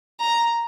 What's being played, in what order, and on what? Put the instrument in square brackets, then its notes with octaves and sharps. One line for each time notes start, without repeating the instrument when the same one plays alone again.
[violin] A#5